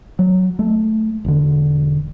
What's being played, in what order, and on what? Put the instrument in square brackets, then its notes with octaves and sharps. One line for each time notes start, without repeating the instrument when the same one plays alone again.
[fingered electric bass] F#3
A3
E1 D3